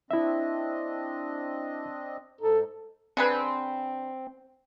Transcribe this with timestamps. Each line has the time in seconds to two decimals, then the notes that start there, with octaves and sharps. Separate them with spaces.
0.11 C4 D4 E4 D#5 E5
2.41 G#2 D#4 A4
3.17 D3 C4 G#4 B4